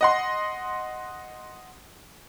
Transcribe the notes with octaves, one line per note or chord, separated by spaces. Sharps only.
D#5 F#5 C6